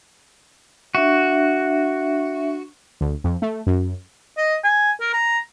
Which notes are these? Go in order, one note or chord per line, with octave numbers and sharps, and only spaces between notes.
D4 F#4 E5
D2
F2
A3
F#2
D#5
G#5
A#4
A#5